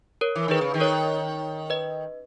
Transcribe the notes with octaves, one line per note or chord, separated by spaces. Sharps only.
A#4 C#5
E3
D#3 G#4 B4
C#3
D#3
A#4 C#5
B4 D#5